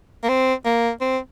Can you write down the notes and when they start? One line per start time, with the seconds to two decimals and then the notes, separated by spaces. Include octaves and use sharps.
0.23 A#3
0.29 C4
0.65 A#3
1.01 C4